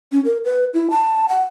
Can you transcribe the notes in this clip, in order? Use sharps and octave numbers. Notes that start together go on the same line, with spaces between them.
C#4
A#4
B4
E4
A5
F#5